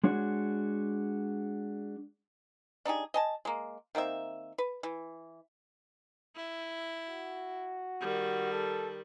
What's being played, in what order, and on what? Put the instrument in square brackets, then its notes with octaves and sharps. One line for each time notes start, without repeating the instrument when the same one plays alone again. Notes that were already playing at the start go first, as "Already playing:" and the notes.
[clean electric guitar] G#3 D4 F#4 C#5
[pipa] D4 D#4 G4 G#4
D#5 G#5 A5
G#3 A#3
D#3 A#3 C4 E5
B4
E3
[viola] E4
[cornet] F#4
[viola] D#3 G3
[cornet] A4